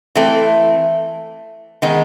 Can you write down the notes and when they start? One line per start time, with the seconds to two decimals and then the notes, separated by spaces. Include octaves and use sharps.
0.15 E3 A3 C4
1.82 D#3 G#3 B3 D#4